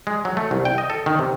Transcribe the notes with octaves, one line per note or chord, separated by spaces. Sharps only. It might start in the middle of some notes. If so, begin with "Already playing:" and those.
G#3
F#3
A3
C2
G5
D#5
A4
D#3
C3